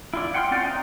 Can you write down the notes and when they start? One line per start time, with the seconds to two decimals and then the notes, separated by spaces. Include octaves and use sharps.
0.14 E4 F4 D5
0.34 F#5 G5 C6 E6 F6
0.51 C4 C#4 F4 D5 G5
0.65 D#4